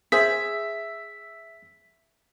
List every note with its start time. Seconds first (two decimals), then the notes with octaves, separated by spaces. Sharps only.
0.12 G#4 C5 E5 B6